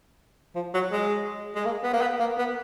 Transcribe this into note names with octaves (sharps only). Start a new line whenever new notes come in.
F3
F#3
G#3
G#3
A#3
B3
A#3
B3
A#3
B3